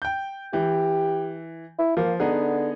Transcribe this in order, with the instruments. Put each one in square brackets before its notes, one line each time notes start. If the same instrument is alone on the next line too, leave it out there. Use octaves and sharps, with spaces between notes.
[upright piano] G5 G6
[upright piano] E3 [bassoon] G4
[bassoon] E4
[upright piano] F3 [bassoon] A#3
[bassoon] D3 [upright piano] B3 D#4 G#4